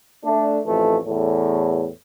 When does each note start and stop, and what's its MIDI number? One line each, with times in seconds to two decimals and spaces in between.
0.24 0.59 57
0.24 0.59 62
0.66 0.97 33
0.66 0.97 41
0.66 0.97 52
0.66 0.97 57
1.06 1.86 40
1.06 1.86 45